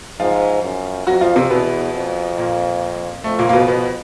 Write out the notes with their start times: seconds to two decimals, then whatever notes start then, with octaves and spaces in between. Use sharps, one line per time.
0.20 G#2 F3 F4
0.64 F#2
1.07 F2 F#3 F#4
1.21 F3 F4
1.36 C3 C4
1.50 E2 B2 B3
1.94 F2
2.37 A#2 A#3
3.24 F2 A3
3.39 A#2 A#3
3.49 A#3
3.53 B2 B3
3.68 B2 B3